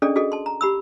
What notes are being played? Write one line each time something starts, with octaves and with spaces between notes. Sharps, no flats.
C#4 D4 G#4 A4 D5 D#5
F#4 G#4 A4 D#5
A5 C6
A#5
G4 B5 E6